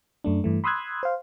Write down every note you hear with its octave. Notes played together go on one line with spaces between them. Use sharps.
F#2 A3 D4
G2 E3 A3
B5 C6 D#6 E6 F#6 G#6
C5 F5